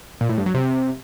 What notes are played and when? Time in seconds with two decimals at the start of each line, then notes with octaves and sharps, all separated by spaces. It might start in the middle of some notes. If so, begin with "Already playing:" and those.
0.21 A#2
0.29 A2
0.38 G2
0.46 F#3
0.54 C3